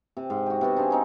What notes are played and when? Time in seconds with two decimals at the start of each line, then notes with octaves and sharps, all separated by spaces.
0.17 C3
0.30 G#2
0.46 F#4 G4
0.61 C3 B3 F#4
0.77 D4 G#4 C5 F5
0.90 C4 D#4 C#5